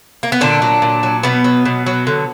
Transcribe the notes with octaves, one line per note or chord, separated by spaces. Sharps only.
A#3
B3
A#2 D3 D4
F#3
A#2
F#3
B2 B3
F#3
B2
F#3
D3